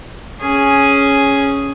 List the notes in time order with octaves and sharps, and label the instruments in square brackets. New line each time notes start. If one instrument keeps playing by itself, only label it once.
[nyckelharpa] C#4 G#4